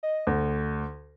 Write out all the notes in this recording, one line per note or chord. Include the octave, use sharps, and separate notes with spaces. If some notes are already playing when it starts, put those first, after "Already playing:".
D#5
D2 A3